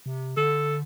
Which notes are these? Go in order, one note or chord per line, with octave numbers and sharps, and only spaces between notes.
C3
D3 A4